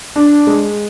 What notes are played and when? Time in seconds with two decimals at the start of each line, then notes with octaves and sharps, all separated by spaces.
0.16 D4
0.47 G#3